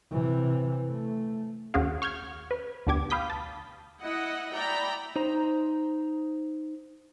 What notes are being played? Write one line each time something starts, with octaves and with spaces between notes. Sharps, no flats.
C3 E3
A3
D#2 C#4 F#4 G#4 F5
C#6 F6 G6 G#6
B4
D2 B2 D4 G4 D6 G#6
F5 B5 D#6 G6 B6
A5
E4 D#5 F#5
D5 E5 G5 A#5 B5
D#4 C5 A#5